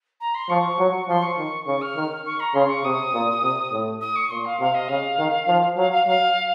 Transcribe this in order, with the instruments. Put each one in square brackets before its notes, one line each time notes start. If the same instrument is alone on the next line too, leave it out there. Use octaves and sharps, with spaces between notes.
[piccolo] A#5
C6
[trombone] F3 [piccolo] C#6
[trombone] F#3
[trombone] F3 [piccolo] C6
[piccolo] C#6
[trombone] D#3
[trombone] C#3 [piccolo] C#6
[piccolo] F6
[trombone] D#3
[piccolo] C#6
A#5
[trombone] C#3 [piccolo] C6
[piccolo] C#6
[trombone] C3 [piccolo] D#6
[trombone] A#2
C3
A2
[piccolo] D#6
C#6
[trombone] A#2 [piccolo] C6
[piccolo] F5
[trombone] C3 [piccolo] F5
[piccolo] D#5
[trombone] C#3 [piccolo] F5
[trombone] D#3
F3
[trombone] F#3 [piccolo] F5
[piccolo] F5
[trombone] F#3 [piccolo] F5